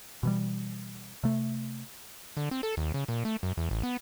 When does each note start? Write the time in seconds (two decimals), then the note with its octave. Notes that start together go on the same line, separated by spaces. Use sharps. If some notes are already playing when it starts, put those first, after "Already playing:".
0.23 B2 E3 G3
1.23 C3 A3
2.37 D3
2.51 C4
2.63 A4
2.77 D#2
2.94 C#3
3.08 A#2
3.25 A3
3.43 F#2
3.57 E2
3.71 A1
3.83 B3